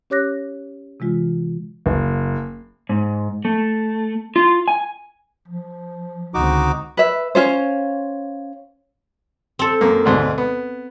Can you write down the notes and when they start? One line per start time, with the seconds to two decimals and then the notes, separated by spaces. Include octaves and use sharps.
0.10 C#4 G4 C#5 D6 F#6 A#6
1.00 C3 E3 G#3 F4
1.86 F#1
2.89 G#2
3.45 A3
4.36 F4
4.68 G#5
5.48 F3
6.34 C#2 D3 C4 D#4 F#4 D6
6.97 B4 E5
7.35 C#4 F4 C5
9.59 C4 A4
9.81 F#2 A#3
10.05 D2 G#2 B2
10.38 B3